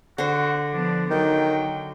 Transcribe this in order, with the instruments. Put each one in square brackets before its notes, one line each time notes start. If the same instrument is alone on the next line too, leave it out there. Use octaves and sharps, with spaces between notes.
[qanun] D3 C5 [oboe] F#4
[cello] F3 B3 [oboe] D4
[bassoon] D#3 [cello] F#3 [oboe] G5